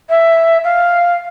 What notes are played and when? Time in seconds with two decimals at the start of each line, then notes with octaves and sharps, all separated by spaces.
0.10 E5
0.64 F5